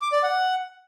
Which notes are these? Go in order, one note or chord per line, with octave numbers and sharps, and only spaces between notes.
D6
D5
F#5